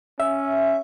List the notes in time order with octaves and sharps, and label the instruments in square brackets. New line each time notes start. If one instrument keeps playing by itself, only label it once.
[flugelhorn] C#4 [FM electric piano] E5